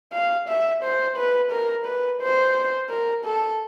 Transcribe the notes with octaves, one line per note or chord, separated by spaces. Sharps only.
F5
E5
C5
B4
A#4
B4
C5
A#4
A4